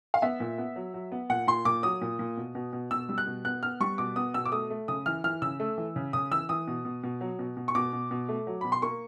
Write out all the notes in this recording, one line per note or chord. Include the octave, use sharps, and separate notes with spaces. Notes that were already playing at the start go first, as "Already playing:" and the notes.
F5
B3 E5
A#2
B3
F#3
F#3
B3
A#2 F#5
A#2 C6
A#2 D6
F#3 D#6
A#2
A#2
B2
B2
B2
B2 E6
G3
F#6
B2
B3 F#6
B3 F6
G3 C#6
B2 D6
B3 D#6
B2 E6
D6
A3 D#6
A3
C#3 D#6
E3 F6
E3 F6
C#3 E6
A3
E3
C#3
C#3 D#6
E3 E6
E3 D#6
B2
B2
B2
F#3
B2
B2
C#6
B2 D6
B2
B2
A3
F#3
B2 B5
C6
A#3 C#6